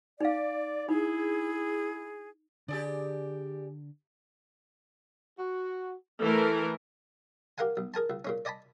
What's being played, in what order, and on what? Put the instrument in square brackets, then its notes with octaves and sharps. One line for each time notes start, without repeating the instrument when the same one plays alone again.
[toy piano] D#4 F5 [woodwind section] D5
[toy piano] D#4 [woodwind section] E4 G#4
[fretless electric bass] D3 [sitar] G4 G#4 D5
[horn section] F#4
[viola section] E3 A3 A#4 [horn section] A4
[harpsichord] G4 A#4 F5 F#5 G#5
B1
G#4 A#4 G#5 A5
C#2
A#2 G#3 C#4
D5 D#5 G#5 A5 B5